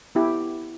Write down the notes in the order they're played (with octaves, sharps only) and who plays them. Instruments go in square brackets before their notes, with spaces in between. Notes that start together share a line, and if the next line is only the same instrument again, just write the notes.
[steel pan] B3 E4 G4